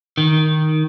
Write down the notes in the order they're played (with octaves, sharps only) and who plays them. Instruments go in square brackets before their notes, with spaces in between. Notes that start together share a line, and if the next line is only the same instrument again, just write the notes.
[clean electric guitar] D#3